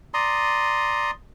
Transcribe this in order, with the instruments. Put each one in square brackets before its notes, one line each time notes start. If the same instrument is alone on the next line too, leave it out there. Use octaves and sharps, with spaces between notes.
[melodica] D5 A#5 C6 D#6